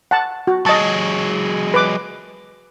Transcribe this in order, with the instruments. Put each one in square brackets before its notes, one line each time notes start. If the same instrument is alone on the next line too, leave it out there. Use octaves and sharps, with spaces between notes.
[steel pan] F#5 A5
F#4
[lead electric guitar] F#3 G#3 [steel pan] D#5 A5
[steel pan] B4 D6